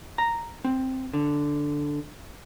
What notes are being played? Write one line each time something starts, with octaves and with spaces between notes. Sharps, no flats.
A#5
C4
D3